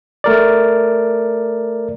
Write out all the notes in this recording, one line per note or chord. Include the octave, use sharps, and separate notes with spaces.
A3 A#4 D5